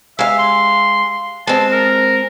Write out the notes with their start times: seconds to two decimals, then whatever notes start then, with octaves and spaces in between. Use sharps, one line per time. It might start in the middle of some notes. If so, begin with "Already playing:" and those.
0.19 G#3 E5 F5
0.39 C6
1.47 G#3 C4 A5
1.72 A#4